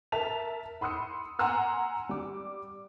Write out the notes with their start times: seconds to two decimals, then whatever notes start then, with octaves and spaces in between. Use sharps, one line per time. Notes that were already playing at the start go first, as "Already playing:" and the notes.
0.12 A#4 E5 A5 B6 F7
0.81 B5 C6 D#6 E6 C#7
1.39 F#5 G#5 A#5 C6 E6 F6
2.09 G3 D6